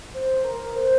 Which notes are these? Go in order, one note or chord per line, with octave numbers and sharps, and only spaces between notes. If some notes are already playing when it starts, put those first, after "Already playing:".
C5
A#4
C5